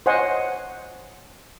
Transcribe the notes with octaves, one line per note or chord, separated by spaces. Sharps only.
C5 C#5 D#5 F#5 G#5 C6